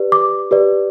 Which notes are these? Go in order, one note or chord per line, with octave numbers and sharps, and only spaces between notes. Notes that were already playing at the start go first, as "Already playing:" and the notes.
Already playing: G4 B4 D5
D6
G4 B4 D5